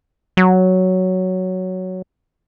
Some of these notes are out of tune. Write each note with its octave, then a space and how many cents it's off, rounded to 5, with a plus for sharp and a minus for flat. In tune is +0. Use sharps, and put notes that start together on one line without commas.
F#3 +5